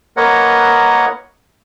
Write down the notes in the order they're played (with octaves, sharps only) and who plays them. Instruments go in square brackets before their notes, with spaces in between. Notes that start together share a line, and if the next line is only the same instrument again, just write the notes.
[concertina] A#3 A#4 B4 C#5 D#5 F#5